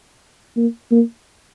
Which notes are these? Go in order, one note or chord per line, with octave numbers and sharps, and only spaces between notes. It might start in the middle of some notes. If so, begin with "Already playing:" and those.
A#3
A#3